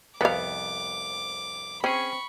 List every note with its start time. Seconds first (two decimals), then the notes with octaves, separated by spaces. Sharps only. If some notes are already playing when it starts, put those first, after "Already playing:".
0.21 C2 F2 B3 B4 F5 D6
1.84 C4 C#4 G#4 B5 C#6